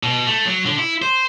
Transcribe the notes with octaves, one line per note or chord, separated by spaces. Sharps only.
B2
A3
F#3
D3
E4
C5